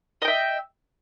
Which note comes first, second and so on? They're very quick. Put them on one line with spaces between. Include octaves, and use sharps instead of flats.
D#5 G5 E5